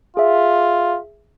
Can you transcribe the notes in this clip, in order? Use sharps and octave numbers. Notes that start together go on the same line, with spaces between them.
F4 G#4 E5